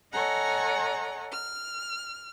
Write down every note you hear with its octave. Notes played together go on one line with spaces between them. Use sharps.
A4 C#5 D#5 F#5 G#5 A#5
F6